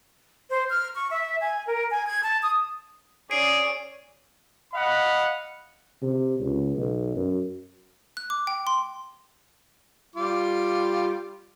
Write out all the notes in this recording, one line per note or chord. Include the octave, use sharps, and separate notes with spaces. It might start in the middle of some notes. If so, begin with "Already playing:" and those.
C5
F6
C#6
E5
G#5
A#4
G#5
G#6
A5
D#6
C#4 G#4 D5 C7 D7 D#7
D#5 F5 F#5 B5
C3
C#2
B1
F#2
F#6
D6
G5
C6
G3 F4 D6